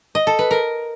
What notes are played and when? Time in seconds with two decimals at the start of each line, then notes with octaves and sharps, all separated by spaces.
0.15 D#5
0.27 A4
0.39 B4
0.51 A#4